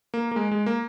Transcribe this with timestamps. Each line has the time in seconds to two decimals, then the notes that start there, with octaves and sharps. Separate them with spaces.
0.14 A#3
0.32 A#3
0.36 G#3
0.51 G#3
0.66 A#3